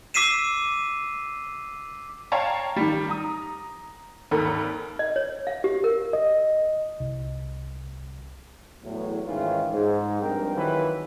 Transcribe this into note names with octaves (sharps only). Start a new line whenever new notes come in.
D6 E6 B6 C7 D#7 E7
C#5 F5 G5 A5 A#5
D#3 G3
A#5 D#6
G#1 D#2 A4 A#4 B5
D#5
C#5
F5
G4
A#4
D#5
C2
E2 A2 F#3
G#2 D#3 E3 C#4 F4
G#2
G2 F3 C4 A#4 G5
D#3 E3 F#3 G#3 F4 B4